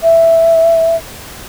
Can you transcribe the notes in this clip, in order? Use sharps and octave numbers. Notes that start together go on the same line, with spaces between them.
E5